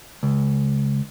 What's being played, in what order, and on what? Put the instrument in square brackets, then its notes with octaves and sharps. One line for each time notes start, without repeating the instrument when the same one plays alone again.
[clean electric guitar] C#2